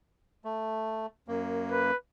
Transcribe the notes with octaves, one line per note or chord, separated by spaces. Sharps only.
A3
F#2 A#3
B4